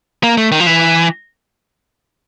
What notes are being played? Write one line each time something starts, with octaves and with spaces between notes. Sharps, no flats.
A#3
A3
D#3
F3
E3